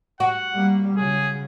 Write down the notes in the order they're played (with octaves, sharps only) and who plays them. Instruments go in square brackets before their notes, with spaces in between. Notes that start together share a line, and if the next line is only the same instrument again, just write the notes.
[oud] F#4 [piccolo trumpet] F#5
[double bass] G3 A#3
[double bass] C#3 F#3 [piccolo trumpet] G#4